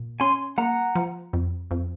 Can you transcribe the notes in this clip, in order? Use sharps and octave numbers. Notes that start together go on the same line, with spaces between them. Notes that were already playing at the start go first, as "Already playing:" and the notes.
Already playing: A#2
C#4 G#5 C6
A#3 F#5 A#5
F3
F2
F2